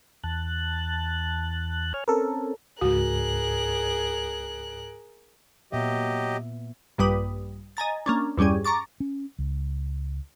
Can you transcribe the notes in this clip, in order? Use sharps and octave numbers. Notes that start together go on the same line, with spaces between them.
E2 A5 F#6
C#5 G#5 F6
C4 C#4 A4 A#4
C#2 G#2 F#4 G#4 A#4 F#6
A#2 F#3 B3 G4 D#5 E5
A#1 G2 G3 B4 D#6
D#5 G#5 A#5 A6
A#3 C#4 D4
E2 G2 G3 C#4 G#4
A#5 C#6 D6 A6
C#4
C#2